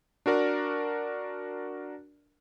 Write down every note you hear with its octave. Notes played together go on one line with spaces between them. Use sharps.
D4 F#4 A#4 D5